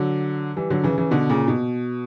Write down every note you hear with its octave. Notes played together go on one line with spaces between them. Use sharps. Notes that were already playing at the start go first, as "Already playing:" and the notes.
Already playing: D3 F#3
E3 G3
D3 F#3
C#3 E3
C#3 E3
B2 D3
A#2 C#3
B2